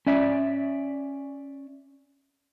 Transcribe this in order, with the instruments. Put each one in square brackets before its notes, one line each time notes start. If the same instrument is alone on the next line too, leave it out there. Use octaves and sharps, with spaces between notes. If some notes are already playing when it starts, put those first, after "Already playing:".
[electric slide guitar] C#4 D5 E5